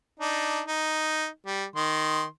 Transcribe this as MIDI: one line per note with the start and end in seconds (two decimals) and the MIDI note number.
0.20 0.62 62
0.20 0.62 63
0.68 1.27 63
1.46 1.65 55
1.76 2.25 51
1.76 2.25 84